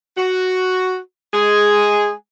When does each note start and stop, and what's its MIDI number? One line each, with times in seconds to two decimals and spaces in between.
0.17 0.97 66
1.33 2.11 56
1.33 2.11 68